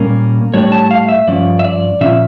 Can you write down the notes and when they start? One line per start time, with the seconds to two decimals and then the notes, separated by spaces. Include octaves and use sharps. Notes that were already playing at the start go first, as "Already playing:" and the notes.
Already playing: A#2 G3 A#3 C#4 A#4
0.54 A2 G3 D4 C#5
0.72 A5
0.91 F5
1.09 E5
1.27 G2 F3 C#4 D5
1.59 E5
1.64 D5
2.01 A#2 F3 C#4 E5